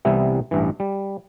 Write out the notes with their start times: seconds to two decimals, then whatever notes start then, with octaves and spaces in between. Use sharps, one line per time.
0.05 C2 C3 E3 G3 B3 E4
0.51 A1 G2 E3
0.80 G3